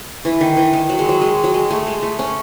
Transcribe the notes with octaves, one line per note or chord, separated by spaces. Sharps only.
E3
D#3
E3
D#3
F#3
G#3
F#3
G#3
F#3
G#3
A3
G#3
A3
C#4